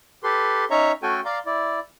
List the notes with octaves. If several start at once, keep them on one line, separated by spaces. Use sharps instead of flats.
G4 A4 B4 C6
C#4 D#4 C#5 E5 A#5 C#6
A3 C#4 F#4 A4 G5 G#5
D5 F5 A#5 C6
E4 D5